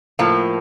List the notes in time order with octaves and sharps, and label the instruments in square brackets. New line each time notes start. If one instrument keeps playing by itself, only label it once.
[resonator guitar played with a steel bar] A2 F3 A#3